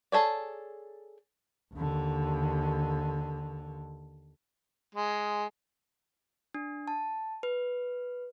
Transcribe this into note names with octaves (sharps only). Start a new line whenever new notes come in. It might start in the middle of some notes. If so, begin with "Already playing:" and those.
G#4 A4 C#5 D5
D#2 D3
G#3
D4
A5
B4